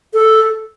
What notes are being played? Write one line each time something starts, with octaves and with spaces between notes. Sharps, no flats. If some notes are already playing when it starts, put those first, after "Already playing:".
A4